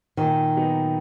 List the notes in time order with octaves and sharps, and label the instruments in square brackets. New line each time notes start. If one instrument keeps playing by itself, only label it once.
[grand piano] A#2 [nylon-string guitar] D#3
[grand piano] F#3 B3 D#4